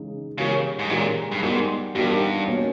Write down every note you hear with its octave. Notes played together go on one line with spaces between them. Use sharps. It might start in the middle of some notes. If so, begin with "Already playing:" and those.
Already playing: C#3 E3 G#3 D#4
C#3 E3 G#3 C#4 G4 A#4
G#2
A#2 E3 G#3 C#4 G4 A#4
G2
G#2 G3 B3 D#4 G4 A#4
G2 G3 B3 D#4 G4 A#4
B2 A#3 C#4